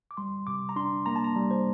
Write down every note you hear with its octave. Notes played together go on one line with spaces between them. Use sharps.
D6
G3 C6
C3 D6
A#5
D4 C6
A#3 A#5
A5
A#5
G3
C5